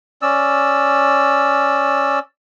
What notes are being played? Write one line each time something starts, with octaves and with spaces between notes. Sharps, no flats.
C#4 D5 E6